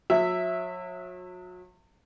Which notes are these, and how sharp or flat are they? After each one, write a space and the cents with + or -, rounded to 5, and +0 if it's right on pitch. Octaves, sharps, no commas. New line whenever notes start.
F#3 -40 E5 +0